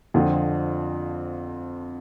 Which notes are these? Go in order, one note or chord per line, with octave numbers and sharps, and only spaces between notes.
F2 D3 F3 C4